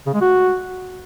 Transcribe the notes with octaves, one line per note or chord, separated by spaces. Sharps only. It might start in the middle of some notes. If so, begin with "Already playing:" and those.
C#3
G#3
F#4